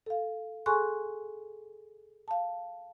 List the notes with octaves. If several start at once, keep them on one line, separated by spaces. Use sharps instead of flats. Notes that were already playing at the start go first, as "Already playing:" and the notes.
A4 F5
G#4 A4 G#5 C6 C#6 F#6
F5 A5